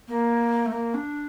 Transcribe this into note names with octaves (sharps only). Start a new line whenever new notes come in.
A#3
A3
A#3
D4